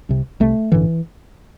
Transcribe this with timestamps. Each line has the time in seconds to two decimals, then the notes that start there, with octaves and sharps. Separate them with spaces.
0.09 C2 C3
0.40 C2 C3 A3
0.72 A1 G2 D3 E3